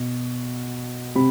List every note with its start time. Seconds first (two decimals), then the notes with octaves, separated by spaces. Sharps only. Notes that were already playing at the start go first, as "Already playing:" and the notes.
Already playing: B2
1.15 C3 B5